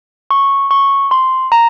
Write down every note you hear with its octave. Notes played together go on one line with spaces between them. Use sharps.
C#6
C#6
C6
A#5